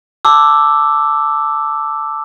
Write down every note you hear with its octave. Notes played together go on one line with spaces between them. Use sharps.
A5 D6 E6